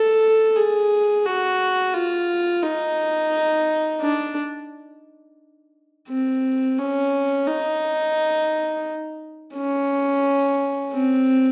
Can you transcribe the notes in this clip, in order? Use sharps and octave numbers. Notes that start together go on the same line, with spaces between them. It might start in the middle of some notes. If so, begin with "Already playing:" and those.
Already playing: A4
G#4
F#4
F4
D#4
D4
C4
C#4
D#4
C#4
C4